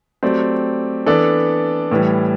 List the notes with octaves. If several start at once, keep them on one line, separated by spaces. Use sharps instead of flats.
F#3 A3 C4 G4 D5
E3 B3 D4 A4 D5
A2 E3 G3